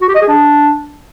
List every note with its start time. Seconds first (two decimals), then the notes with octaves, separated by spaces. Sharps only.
0.01 F#4
0.08 G4
0.15 D#5
0.22 G#4
0.28 D4